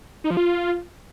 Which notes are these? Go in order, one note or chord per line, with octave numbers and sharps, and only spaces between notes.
D#4
F3
F4